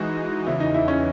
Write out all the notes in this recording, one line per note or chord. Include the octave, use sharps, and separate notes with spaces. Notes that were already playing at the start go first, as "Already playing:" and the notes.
Already playing: E3 G#3 D#4 F#4
E2 C#3 E3 E4
D#4
E4
C#4